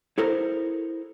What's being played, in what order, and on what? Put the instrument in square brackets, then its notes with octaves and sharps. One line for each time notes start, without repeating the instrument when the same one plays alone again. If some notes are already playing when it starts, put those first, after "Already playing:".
[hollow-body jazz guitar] E4 A4 A#4 C5